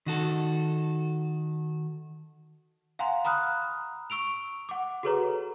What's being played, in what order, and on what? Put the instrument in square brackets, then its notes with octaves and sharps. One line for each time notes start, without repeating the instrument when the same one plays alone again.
[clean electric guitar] D#3 F#4 A4
[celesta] F5 F#5 G#5 A#5 C6
A#5 B5 D#6 F6 F#6
C#6 E6 D7 F7
F#5 D6
F#4 G#4 A4 B4 C#5 A#5